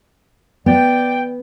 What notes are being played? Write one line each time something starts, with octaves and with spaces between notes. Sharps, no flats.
B3 D5 G5